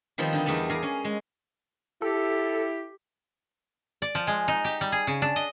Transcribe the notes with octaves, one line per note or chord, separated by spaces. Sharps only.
D#3 F3 G3 B3 C4
D3 D#4
E2 G3 A3 B3 A5
G#4 A#4 D5 F5 G#5
C#4
G#3
E4 G4 A4
D5
F3
G#3
D#4
G4
G3
G#4
C#3
D4
D#5